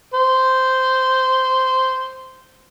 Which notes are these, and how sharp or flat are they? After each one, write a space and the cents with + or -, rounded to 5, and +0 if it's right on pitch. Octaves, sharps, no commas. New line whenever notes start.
C5 -10